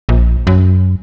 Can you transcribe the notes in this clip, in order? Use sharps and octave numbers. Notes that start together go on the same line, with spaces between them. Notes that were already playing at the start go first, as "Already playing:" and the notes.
A#1
F#2